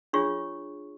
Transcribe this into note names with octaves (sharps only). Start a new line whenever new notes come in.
D4 F4 G#4 C#5 C#6